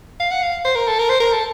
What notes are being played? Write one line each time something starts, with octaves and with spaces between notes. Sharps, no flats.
F5
F#5
F5
C5
A#4
A4
A#4
C5
A#4
A4